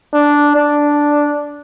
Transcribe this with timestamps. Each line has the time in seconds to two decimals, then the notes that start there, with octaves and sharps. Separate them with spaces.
0.13 D4
0.55 D4